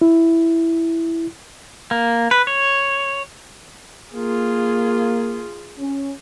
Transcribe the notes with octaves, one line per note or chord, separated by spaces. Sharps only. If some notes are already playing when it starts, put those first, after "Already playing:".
E4
A#3
B4
C#5
A#3 F4 G#4
C#4